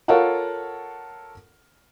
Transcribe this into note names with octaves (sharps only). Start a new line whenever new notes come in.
F4 A4 A#4 C#5 F5 F#5